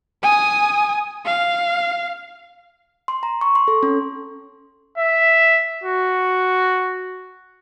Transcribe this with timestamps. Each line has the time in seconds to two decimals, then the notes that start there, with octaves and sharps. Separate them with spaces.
0.23 G#5 D#6
1.26 F5
3.08 C6
3.23 A#5
3.41 C#6
3.55 C6
3.68 A4
3.83 C#4
4.98 E5
5.84 F#4